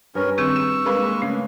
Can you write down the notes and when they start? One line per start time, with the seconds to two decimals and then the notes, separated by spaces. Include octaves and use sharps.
0.15 G2 C#4 A#4
0.38 D#3 C4 G#4 C#6 E6
0.56 E7
0.85 G#3 A#3 B4
1.22 C#3 A3